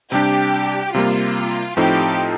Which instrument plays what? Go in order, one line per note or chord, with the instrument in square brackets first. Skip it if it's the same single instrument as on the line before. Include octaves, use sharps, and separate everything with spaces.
[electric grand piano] C3 G3 D4 [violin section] G4
[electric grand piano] C3 G3 A#3 [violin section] F4
[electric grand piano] A2 F3 C4 D#4 A4 [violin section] G4